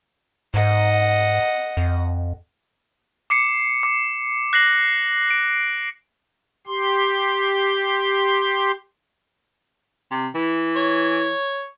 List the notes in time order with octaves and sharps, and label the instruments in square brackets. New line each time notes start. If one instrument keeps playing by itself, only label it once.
[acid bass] G#2 [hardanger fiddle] D#5 F#5
[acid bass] F2
[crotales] D6 C7 C#7
D6
F#6 A#6 C7 F#7
D7
[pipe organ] G4 C6
[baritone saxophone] C3
E3
[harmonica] C#5